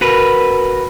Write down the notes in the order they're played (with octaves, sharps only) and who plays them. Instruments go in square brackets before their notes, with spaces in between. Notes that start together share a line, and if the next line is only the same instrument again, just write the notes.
[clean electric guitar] F#4 A#4 B4